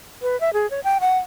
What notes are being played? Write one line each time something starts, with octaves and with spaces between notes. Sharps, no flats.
B4
E5
G#4
C#5
G5
F#5